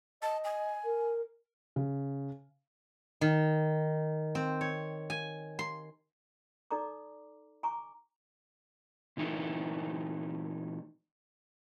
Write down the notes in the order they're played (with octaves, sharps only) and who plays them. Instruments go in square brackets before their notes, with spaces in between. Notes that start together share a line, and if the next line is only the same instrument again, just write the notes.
[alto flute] D#5 [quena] A5
[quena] G#5
[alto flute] A#4
[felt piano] C#3
[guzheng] D#3
C4
C#5
G#5
C6
[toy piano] D#4 A4 D5 A#5 D6
G#5 A#5 C#6 D6
[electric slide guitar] A#2 E3 D#4 E4